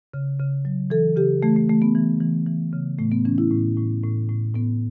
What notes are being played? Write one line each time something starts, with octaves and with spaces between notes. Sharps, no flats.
C#3
C#3
F#3
E3 A4
C#3 G4
E3 A3
A3
E3 A3
B3
E3
E3
E3
C#3
A2 A3
B3
E3 C#4
E4
A2
A2
A2
A2
A2 B3